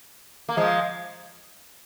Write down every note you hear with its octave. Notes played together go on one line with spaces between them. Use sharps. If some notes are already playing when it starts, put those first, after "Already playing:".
A#3
F3 G#3